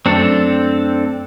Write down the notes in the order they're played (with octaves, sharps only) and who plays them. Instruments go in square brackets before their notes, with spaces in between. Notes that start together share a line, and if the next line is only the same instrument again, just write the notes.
[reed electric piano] F#2 A3 [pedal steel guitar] C4 D4 A4